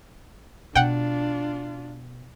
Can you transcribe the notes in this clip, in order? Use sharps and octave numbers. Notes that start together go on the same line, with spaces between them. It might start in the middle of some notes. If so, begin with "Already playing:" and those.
B2 D4 F4 F#5 G5